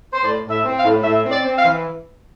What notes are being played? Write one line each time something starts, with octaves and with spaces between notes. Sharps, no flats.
C5
A2 D5
A2
E5
C4
F5
A2
A2 E5
C4
D5
C4
F5
E3